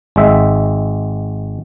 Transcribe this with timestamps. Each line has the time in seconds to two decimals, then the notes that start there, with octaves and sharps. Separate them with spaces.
0.16 G#1 G#3 E5